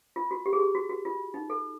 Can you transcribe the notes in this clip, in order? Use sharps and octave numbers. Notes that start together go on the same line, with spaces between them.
F4
F#4
G4
G#4
G4
F#4
F#4
F4
D#4
A4